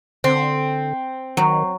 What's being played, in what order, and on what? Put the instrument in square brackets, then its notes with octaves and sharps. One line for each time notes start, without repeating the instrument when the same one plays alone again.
[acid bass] D3 [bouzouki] C4
[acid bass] D#3 [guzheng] F#3